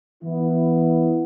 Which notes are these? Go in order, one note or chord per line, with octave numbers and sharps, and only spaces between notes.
E3 B3 E4